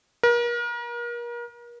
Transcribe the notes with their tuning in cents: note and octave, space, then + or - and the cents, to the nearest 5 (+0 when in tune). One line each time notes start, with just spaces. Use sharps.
A#4 +35